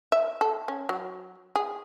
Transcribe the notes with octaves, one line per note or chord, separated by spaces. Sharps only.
E5
A4
C#4
F#3
G#4